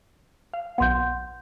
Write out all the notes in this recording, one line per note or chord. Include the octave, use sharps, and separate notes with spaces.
F5
B1 B3 F#5 C6 G6